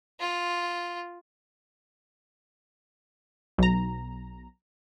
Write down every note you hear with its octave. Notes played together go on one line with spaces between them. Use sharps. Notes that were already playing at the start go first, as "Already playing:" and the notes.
F4
B1 A#5